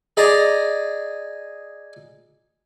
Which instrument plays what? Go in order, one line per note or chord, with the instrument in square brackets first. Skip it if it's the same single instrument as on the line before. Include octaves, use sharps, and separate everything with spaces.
[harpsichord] G#4 D5 D#5 A#5